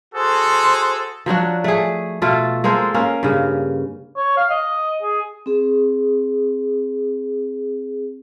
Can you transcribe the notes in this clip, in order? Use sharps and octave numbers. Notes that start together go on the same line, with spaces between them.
F#4 G#4 A4 C5
F3 F#3 D4 F#4
A3 G#4
B2 A3 F4 A4
G#3 A#3 A4 C5
A#3 C#4
G2 C#3
C#5
F5
D#5
G#4
C4 G#4